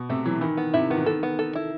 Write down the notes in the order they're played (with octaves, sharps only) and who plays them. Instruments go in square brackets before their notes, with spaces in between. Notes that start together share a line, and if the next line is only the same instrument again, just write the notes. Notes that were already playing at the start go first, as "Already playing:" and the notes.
Already playing: [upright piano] B2
[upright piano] C3 [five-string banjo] A3
[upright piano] E3 [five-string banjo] F#3
[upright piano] D#3 [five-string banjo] E3
[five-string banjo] B3
[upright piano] C3 [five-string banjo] E4
[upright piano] D#3 [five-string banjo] B3
[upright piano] E3
[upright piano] D#3 [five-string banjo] A4
[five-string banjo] B3
A4
E4